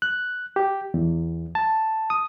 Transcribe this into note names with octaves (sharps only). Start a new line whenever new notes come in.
F#6
G4
E2
A5
D#6